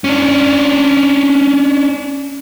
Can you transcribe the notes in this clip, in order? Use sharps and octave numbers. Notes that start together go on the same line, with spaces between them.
C#4 D4